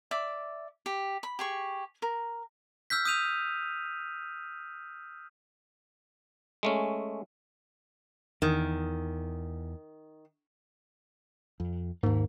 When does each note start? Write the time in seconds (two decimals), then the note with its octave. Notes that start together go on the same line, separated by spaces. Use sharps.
0.11 D5 E5 D6
0.86 G4
1.23 B5
1.39 G4 G#4 C#6
2.02 A#4
2.90 E6 F6 G6 B6
3.05 D#6 G6 D#7 F7
6.63 G#3 A3 C#4
8.42 E2 D#3
11.60 F2
12.03 D#2 G#2 A#3